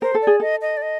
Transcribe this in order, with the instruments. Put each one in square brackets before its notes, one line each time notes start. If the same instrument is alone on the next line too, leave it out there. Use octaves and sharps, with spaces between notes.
[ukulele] A#4 [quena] C5
[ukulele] A4
[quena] D5
[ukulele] G#4
[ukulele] A4 [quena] D#5
[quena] D#5
D5
D#5